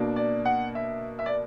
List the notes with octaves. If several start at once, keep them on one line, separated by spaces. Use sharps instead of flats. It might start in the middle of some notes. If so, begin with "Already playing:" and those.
Already playing: B2 A#3 D4
D5
F#5
E5
E5
D5